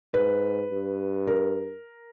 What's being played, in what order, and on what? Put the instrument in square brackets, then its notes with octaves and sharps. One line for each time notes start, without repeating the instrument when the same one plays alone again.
[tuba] G#2 [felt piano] B4
[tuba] G2
[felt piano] A#4